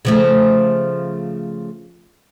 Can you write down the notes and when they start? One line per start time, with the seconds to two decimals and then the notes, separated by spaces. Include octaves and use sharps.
0.05 C#3 F3 A3